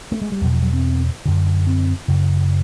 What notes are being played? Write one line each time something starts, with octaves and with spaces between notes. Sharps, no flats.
A3
G#3
G3
E2 B2 F#3
F3
F#3
C4
F#2 D3
C4
F#2 C#3